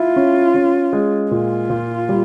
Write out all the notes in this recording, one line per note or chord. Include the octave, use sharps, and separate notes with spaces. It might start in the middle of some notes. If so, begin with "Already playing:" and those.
Already playing: E4 F4
C#4
C#4
G#3
A#2 F4
A#2
G3